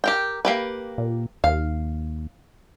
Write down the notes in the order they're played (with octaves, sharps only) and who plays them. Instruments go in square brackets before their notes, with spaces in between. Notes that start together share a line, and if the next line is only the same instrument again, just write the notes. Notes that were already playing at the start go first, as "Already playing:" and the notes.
[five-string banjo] G4 A#4 G5
A#3 G4 B4
[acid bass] A#2
[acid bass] D#2 [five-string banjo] F5